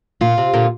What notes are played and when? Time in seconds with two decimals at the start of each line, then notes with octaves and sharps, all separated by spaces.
0.21 A#2 F4
0.38 C3
0.54 A#2 D3